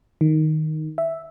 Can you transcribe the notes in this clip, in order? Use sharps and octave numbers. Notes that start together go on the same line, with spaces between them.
D#3
E5